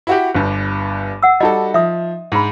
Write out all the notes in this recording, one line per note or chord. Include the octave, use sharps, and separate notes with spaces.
E4 F#4 G4
G1 G2
F#5 E6
G3 D#4 F#4 A4 D#5
F3 E5 D#6
G#2 D4 B5